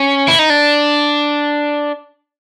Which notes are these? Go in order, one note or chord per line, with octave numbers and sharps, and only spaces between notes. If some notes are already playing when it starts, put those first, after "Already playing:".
Already playing: C#4
E4
D#4
D4